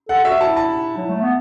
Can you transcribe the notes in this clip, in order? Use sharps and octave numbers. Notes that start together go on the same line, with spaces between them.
A4 F#5
F#4 E5
E4 A5
A5
F#3
A3
B3